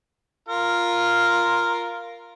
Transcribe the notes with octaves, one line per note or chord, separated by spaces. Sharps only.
F4 A#4